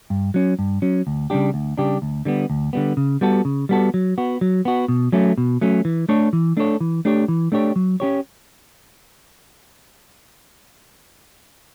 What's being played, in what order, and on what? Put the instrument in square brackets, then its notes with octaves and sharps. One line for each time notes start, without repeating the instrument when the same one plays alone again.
[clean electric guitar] G2
F#3 C#4
G2
F#3 C#4
D2
C#3 G3 D4 G4
D2
C#3 G3 D4 G4
D2
D3 G3 B3
D2
D3 G3 B3
C#3
G3 B3 F#4 A4
C#3
G3 B3 F#4 A4
F#3
B3 F#4
F#3
B3 F#4
B2
F#3 A3 C#4
B2
F#3 A3 C#4
E3
A3 D4 A4 C#5
E3
A3 D4 A4 C#5
E3
A3 D4 G4 C#5
E3
A3 D4 G4 C#5
F#3
C#4 G4 C#5